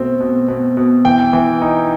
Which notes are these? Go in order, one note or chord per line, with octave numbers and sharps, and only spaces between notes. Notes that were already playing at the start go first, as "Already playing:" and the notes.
Already playing: B2 A3 C4
B2
B2
B2
E3 G5
E3
D#4